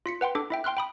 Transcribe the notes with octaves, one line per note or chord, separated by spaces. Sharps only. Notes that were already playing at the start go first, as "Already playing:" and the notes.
F4 B6 C#7
B4 F#5 G5 C6
D4 A4 D6
E4 E5 G5
G5 C6 F6 F#6
G5 B5 D#6